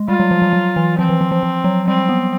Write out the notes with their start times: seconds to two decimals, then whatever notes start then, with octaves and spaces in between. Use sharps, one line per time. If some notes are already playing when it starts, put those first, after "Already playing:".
Already playing: G#3
0.08 G3 F4
0.20 F#3
0.31 F3
0.42 F#3
0.53 F#3
0.76 E3
0.98 F3 C4
1.09 E3
1.21 F3
1.31 F3
1.43 F3
1.64 F#3
1.87 G3 C4
2.09 B3